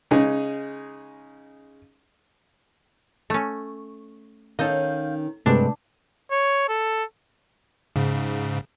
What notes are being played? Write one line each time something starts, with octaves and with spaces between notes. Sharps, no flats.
C#3 G#3 C#4 D#4 G#4
A3 C#4
D#3 C#4 A4 D#5 F5 G6
G2 C3 G#3 A3 D4
C#5
A4
G#2 C#3